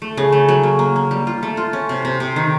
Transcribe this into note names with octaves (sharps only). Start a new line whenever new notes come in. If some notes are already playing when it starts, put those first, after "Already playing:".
A3
C#3
A3
F#3
A#3
A#3
A#3
G3
F4
A3
F4
C#4
C3
C3
C3
D#3